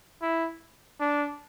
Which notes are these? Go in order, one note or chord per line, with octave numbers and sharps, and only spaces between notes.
E4
D4